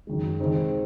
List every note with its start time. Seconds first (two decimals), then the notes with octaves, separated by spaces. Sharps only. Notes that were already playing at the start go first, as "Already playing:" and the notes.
0.07 F#2 D#3 G#3
0.40 C3 D#3 G#3 C4 D#4